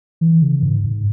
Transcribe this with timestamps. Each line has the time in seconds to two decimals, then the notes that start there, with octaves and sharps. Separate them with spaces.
0.21 E3
0.42 C#3
0.63 G#2
0.84 G#2